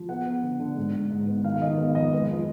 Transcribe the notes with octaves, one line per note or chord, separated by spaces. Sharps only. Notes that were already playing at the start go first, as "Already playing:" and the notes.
Already playing: F3
B3 F#5
B3
D3
D3
G#2
G#2
G#2
B3
D#3 F5
F5
D#3 D#5
B3 F5
F2 D#5
G#3 B4
F3